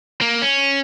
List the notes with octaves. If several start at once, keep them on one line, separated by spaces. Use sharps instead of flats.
A#3
C#4